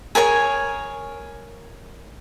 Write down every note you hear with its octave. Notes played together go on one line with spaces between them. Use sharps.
G#4 A#4 C#5 G#5